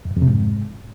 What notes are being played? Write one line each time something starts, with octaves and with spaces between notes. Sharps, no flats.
F2
F#2
F2
C3
G#2